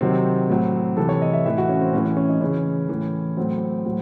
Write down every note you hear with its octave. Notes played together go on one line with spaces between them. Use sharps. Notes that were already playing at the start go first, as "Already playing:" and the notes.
C3 D#3 F#3 C4
A2 F#3
C3 E3 A4
C#5
D#5
E5
A2 E3 E5
F#4
C#4
C4
A2 E3 C#4
C#4
C#4
D#4
C#3 E3 C#4
A2 E3
A2 F#3 C4
C4
A2 F#3